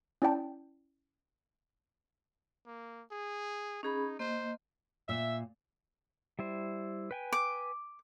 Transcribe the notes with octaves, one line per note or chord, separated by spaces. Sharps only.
C#4 E4 D5 G5 A5
A#3
G#4
C#4 D#4 G#4 B5
A#3 C5 D#5
A#2 E5
G3 E4 C5
B4 G5 G#5
D6